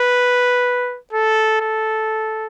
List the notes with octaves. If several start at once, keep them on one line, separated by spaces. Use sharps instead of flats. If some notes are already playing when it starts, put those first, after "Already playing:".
Already playing: B4
A4
A4